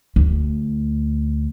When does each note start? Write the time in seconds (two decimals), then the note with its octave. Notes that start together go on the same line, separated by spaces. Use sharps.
0.16 D2